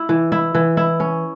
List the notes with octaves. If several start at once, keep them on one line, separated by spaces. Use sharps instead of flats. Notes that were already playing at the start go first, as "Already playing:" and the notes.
Already playing: E4
E3
E4
E3
E4
C#4